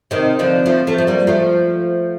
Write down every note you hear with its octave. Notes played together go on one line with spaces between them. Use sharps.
C3 D#3
D3 F3
F3 A3
F3 A3
A3
G3 A#3
F3 A3